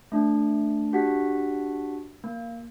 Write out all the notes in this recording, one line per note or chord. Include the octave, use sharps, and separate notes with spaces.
A3 D4
D4 F#4 G4 F#5 B6
A#3